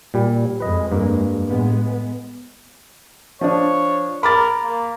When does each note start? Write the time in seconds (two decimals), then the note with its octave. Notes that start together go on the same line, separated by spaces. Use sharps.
0.14 A#2 G3
0.60 F2 G#3 B4 D#5
0.92 G2 A#3
1.49 A2 G#3 B3
3.41 F3 D4 C#5
4.23 A#4 B5 D6 A6
4.64 A#3